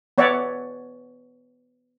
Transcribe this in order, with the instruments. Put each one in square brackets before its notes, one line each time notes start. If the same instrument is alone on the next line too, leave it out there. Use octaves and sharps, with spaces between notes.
[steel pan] B3 C#5 D5 E5 F#5